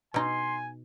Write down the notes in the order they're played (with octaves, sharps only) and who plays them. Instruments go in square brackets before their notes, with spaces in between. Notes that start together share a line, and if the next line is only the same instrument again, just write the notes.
[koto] B2 D#4 [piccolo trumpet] G#5 [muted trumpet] C6